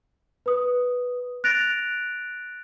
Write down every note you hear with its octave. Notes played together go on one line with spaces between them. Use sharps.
B4 D#6
F#6 A6 A#6 D7 F7